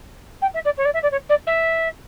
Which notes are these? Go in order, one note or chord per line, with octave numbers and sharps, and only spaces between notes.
G5
E5
D5
C#5
D5
E5
D5
C#5
D5
E5